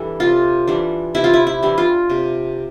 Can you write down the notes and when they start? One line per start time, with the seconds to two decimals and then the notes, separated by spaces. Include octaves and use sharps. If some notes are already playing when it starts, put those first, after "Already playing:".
Already playing: E3 G3 D4 A4
0.20 C3 F4
0.68 E3 G3 D4
1.15 C3 E4
1.24 F4
1.34 E4
1.47 E4
1.63 E3 G3 D4
1.78 F4
2.10 C3